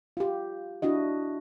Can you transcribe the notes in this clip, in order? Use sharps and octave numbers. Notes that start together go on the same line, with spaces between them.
F4 G4
D4 E4 F#4 D#5